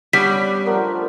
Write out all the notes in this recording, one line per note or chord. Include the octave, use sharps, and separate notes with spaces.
G3 B3 C#4 D4 B6
F3 A3 B3 A#4